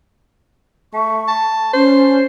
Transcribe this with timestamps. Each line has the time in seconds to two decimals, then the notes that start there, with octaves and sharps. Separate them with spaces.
0.93 A3 C#6
1.28 A5
1.73 C#4 C5